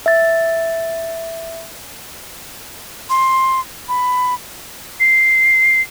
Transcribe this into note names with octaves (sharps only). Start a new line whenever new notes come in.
E5 A6
C6
B5
C7